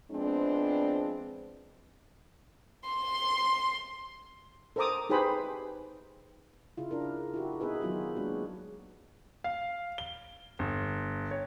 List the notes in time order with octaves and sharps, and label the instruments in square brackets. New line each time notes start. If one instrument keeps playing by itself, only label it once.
[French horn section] F3 G#3 B3 C4 D4
[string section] C6
[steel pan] A4 A#4 C5 A#5 D6 D#6
D#4 G4 G#4 B4 C5 B5
[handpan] C#3 E4 F4
D4 E4 A#4
E4 F#4 G4
B3 D#4 G#4 B4 E5
D#3 F#3 B3 D#4 F4 F#4
G#3 A#3 C#4 D4 F#4
[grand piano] F5
G7
G1
C#5